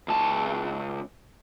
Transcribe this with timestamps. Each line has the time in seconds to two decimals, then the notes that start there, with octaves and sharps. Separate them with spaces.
0.08 C#2 A5